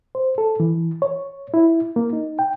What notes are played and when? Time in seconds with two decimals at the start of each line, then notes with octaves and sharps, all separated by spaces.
0.15 C5
0.38 A4
0.60 E3
1.02 C#5
1.54 E4
1.96 A#3
2.13 D#4
2.39 G5